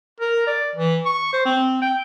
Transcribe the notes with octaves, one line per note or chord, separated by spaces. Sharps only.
A#4
D5
E3
C#6
C5
C4
G5